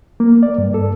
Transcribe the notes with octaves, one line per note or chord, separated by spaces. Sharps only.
A#3
D5
G2
A4